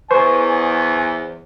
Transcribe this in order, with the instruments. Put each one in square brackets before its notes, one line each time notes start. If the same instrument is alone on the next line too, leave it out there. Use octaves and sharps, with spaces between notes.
[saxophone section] E2 [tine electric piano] B4 C#6 [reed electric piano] C5 [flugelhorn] G#5